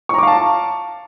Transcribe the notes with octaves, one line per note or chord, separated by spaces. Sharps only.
F5 A5 A#5 C#6 D6